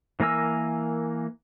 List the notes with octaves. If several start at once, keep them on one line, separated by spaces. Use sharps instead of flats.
E3 A#3 A#4 G#5 E6